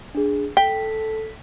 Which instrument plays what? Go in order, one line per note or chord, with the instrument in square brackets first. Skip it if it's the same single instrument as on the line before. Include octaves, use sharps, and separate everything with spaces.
[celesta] D4 G#4
[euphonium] A4 [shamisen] G5 [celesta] B6